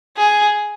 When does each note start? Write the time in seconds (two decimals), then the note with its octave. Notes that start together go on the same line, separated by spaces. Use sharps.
0.17 G#4